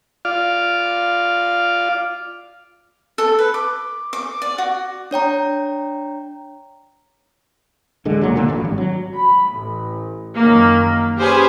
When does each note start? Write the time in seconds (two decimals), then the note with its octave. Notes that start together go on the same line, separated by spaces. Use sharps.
0.25 F4 D5 F5
3.18 A4
3.39 B4
3.54 D6
4.13 D6
4.42 D5
4.58 F#4
5.11 D4 C#5 G5 A#5
8.05 D1 D3 G#3
8.22 C#2 A#2 F#3
8.36 A#2 D3 F3 A#3
8.48 A1 G2
8.65 G#1
8.78 F#3
9.13 B5
9.52 A1
10.36 F#2 D#3 A#3
11.18 C#4 G4 G#4 B4 C5 G#5